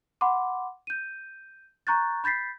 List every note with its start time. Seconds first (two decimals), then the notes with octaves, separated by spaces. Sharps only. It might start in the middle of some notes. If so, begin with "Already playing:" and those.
0.21 F#5 B5 C6 D6
0.87 G6 D#7
1.87 A#5 C#6 F#6 G6 A6
2.24 B5 G6 A6 B6 C7